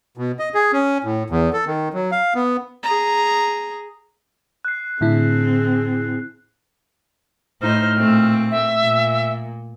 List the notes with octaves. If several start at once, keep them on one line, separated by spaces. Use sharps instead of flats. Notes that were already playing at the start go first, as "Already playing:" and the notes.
B2
D#5
G#4
C#4
A2
E2
A4
D#3
F#3
F5
B3
G#4 A#5
F#6 C7
A2 D3 C4 E4 G#4
A2 D#4 C5 F6
A#2 A3 C4
E5
A#2